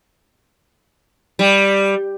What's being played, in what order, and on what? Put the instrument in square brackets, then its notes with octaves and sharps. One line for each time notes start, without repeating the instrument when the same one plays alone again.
[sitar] G3